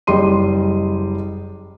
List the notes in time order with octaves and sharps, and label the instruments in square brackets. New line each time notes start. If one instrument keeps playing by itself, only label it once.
[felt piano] F#1 G3 D#5 C6 D#7